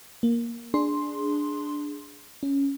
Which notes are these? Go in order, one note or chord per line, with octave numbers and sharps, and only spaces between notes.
A#3
D4 G#4 C6
C#4